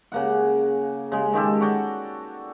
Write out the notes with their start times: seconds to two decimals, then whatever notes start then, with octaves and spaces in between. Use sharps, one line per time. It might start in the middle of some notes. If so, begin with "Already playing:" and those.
0.12 C#3 A#3 F#5
1.12 C#3 G#3
1.33 D#3 G#3 G4 A4
1.61 F#4 C#5 D5 G5